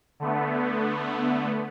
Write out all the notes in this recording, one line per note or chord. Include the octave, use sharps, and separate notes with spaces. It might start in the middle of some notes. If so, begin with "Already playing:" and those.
D3 A3 B3